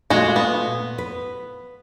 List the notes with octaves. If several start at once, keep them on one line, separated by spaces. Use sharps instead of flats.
A#2 G#3 A3 F#4
B3
B4